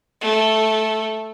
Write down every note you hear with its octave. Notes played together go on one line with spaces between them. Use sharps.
A3